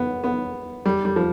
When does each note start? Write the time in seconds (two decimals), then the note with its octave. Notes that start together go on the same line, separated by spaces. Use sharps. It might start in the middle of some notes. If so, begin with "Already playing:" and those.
Already playing: B3
0.24 B3
0.86 G3
1.05 G3
1.16 F3